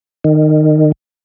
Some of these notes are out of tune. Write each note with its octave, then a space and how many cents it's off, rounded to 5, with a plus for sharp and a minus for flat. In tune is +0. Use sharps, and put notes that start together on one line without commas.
D#3 -20